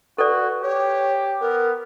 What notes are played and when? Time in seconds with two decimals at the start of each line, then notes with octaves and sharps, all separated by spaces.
0.18 F#4 A4 B4 D5
0.63 G4 C#5
1.41 B3 A#4